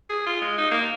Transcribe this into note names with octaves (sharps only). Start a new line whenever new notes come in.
G#4
F4
G#3
D#4
A#3